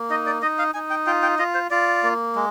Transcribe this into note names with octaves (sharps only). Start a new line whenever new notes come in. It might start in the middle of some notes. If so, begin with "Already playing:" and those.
Already playing: A#3
D#4 D#5
D5
D#4 D#5
F5
D#4 G#5
G5
F4 G5
G5
F4 D#5
C5
F4 D5
A#3
G#3